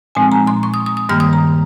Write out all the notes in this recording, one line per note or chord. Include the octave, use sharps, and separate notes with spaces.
A#2 F3 G#3 C4 D#4 G#5
A#5
C6
C#6
D#6
D#6
D#6
G2 D#3 G3 A#3 F6
D#6
A#5